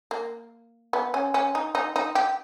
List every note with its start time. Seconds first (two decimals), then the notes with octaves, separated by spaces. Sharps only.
0.11 A#3
0.93 B3
1.14 C#4
1.34 C#4
1.55 D#4
1.75 D#4
1.96 D#4
2.15 G4